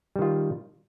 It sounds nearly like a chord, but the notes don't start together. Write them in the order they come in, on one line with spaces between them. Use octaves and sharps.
G3 D#3 F4